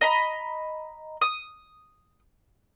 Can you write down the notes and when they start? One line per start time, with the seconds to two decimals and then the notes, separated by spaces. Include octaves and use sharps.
0.01 D#5 A#5 B5
1.21 D#6